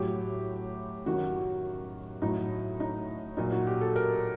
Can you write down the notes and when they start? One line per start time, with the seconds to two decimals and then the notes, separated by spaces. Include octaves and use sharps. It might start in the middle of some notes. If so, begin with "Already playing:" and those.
Already playing: A2 F#3 G4
1.05 F#2 D#3 F#3 F#4
2.22 A2 F#3 D#4
2.80 D#4
3.37 A#2 F#3 D#4
3.52 F#4
3.67 G4
3.81 A4
3.96 A#4